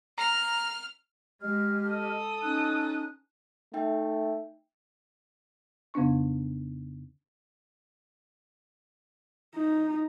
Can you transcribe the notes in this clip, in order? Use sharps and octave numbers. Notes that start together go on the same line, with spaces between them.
A#5 F6
G#3 G4 D#5 F6
A4 D#6
C#4 D#4 F#6
A3 D#4 E5 G5
F2 C#3 B3 D4 C#6
D#4